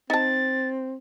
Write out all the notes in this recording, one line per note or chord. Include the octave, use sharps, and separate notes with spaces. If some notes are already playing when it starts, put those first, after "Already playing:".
C4 D#4 A5 A6